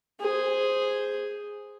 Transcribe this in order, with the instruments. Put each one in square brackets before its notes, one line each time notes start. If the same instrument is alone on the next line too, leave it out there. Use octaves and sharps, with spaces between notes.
[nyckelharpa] G#4 C5